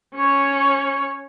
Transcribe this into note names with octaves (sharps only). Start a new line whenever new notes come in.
C#4 C#5